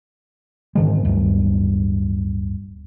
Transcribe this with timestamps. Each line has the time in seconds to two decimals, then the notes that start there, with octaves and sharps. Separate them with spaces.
0.75 G#2 D3 D#3 G#3
1.05 D1 G2